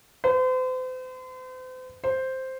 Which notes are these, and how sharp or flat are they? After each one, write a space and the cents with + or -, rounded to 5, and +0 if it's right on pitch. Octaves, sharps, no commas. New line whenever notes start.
C5 -40
C5 +0